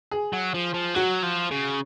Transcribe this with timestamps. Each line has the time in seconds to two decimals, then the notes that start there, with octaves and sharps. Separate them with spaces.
0.11 G#4
0.33 F#3
0.54 F3
0.74 F3
0.95 F#3 F#4
1.23 F3
1.51 C#3